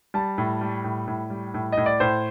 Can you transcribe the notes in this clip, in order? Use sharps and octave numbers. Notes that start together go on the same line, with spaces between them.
G3 A5
A2
G3
A2
A2
G3
A2
A2 D#5
D5
A2 C5